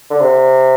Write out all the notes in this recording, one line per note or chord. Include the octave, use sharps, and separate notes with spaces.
D3
C3